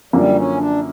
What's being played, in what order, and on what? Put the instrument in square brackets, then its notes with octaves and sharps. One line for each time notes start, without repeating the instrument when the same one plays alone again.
[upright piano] F#2 D3 F3 A#3 [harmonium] G3
[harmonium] C#4
D4